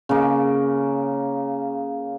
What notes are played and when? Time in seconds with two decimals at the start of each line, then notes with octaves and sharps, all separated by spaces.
0.09 C#3 A#3